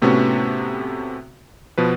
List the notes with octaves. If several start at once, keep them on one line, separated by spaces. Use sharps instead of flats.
A2 C3 A3 B3 C#4 F#4
B2 F3 B4